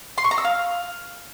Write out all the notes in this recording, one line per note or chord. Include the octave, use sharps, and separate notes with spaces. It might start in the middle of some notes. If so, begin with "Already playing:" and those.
C6
C#6
A#5
E6
F5